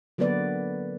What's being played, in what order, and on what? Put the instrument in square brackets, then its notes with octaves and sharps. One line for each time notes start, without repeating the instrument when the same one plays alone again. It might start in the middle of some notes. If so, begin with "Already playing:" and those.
[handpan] D3 F#3 A#3 B3 B4 D5